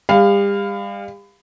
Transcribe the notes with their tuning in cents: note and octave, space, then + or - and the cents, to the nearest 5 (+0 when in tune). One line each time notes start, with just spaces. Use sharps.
G3 +40 F5 +0